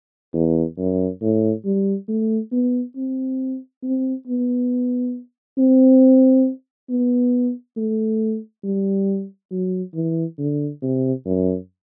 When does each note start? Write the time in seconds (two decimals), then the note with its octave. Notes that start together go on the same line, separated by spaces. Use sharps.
0.33 E2
0.78 F#2
1.22 A2
1.65 G3
2.08 A3
2.52 B3
2.97 C4
3.84 C4
4.27 B3
5.58 C4
6.90 B3
7.77 A3
8.64 G3
9.52 F#3
9.95 E3
10.39 D3
10.82 C3
11.26 F#2